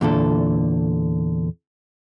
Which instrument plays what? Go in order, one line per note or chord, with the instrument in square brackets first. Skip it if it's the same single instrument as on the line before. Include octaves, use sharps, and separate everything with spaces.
[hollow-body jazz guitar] E2 A#2 D3 A4